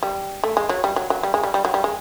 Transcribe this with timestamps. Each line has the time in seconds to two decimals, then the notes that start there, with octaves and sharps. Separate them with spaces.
0.03 G3
0.44 A3
0.57 G#3
0.69 F#3
0.84 G3
0.96 F#3
1.10 F#3
1.23 G3
1.34 G#3
1.43 G3
1.54 G3
1.65 F#3
1.74 G3
1.84 G#3